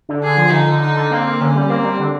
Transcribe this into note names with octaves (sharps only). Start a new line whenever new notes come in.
D3
D3 G#4
F3
D3 D#4
D3
D3 D#4
D3
A#3 C4
A#3
D3 C#4
G3
A#3 C4
G3
D3